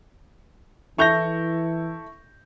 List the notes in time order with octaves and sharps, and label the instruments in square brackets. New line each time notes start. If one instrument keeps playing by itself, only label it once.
[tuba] E3 [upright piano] E4 A4 F7 [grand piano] C#6 G6 A#6